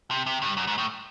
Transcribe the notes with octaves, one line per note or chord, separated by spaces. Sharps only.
C3
C3
G2
F#2
G#2
A2